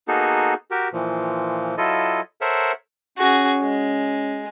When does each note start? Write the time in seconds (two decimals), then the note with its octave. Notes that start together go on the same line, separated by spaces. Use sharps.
0.08 A#3 B3 D#4 F#4 G#4 A4
0.71 F#4 G4 A#4
0.93 A#2 E3 F3
1.78 F#3 E4 F4 A4 D#5
2.41 A4 A#4 C5 C#5 E5 F#5
3.18 C#4 F#4 G#4
3.61 G#3